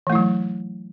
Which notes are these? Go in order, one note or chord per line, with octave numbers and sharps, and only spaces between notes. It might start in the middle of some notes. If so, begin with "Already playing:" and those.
E3 F#3 A3 E4